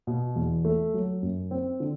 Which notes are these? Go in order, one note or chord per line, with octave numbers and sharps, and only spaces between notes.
B2
E2
A3
F#3
F#2
C4
D3